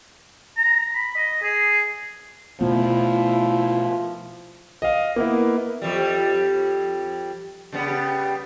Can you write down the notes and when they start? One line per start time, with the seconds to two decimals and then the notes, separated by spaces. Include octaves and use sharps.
0.57 A#5
0.95 B5
1.16 D#5
1.42 G#4
2.61 B2 F3 A3 B3 E4
4.82 D#5 F5
5.16 A#3 B3 E4
5.82 F2 G3
7.72 C#3 G3 B3